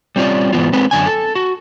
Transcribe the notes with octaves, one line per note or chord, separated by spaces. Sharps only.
G3 C4 C#4 F4 D5
G#2 E3 G3 B3 F4
G#3 C4 B4
F#2 D3 G#5
A4
F#4